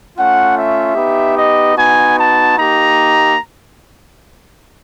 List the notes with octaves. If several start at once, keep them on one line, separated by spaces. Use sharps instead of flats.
A3 C#4 F4 F#5
E5
B3 D#4 G4
D#5
B3 D#4 F#4 G#5
A5
A#3 D#4 G4 A#5